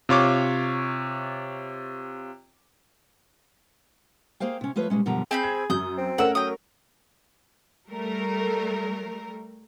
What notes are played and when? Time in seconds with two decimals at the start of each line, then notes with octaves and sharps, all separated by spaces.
0.09 C3 F4 C#5 D6
4.40 A#3 G#4 C5 F5 G5
4.61 C3 C#4
4.76 F3 A3 F4 B4 C#5
4.90 B2 G3 G#3 C#4
5.06 F#2 B2 D3 F3 G3 A#5
5.31 C4 G#4 B5 G6
5.43 G#6
5.70 F#2 D#6 G6
5.98 C4
6.18 A3 C#4 A#4 F#5 E6
6.35 F#3 G5 D#6
7.88 G3 A3 A#4